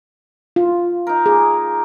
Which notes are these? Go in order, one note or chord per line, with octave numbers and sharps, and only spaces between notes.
F4
D#4 A#4
A#3 G#4